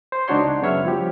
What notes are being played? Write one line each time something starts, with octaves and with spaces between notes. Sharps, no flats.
C5
C#2 D4 D#4 F#4 C#5 C6
F#2 C#3 B3 C#5 E5 F6
F3 G3 G4